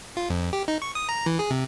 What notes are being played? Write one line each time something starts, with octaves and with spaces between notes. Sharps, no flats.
F4
F2
G4
D#4
C#6
D#6
A#5
E3
G#4
C3